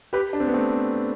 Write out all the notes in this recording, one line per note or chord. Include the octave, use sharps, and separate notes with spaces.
G4 B4
D4
C4
B3
A3 C4